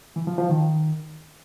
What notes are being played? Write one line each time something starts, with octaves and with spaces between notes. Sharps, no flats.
E3
F3
F3
D#3